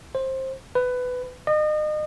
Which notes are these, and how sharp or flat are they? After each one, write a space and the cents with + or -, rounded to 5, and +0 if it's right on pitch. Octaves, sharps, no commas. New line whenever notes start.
C5 +15
B4 +15
D#5 -35